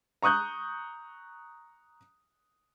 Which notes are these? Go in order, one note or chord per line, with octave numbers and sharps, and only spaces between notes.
A#5 C#6 D#6 F#6 G6